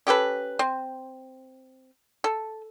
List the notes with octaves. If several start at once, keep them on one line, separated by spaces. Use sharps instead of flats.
C#4 G4 A4 B4
C4
A4